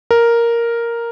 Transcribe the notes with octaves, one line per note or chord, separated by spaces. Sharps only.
A#4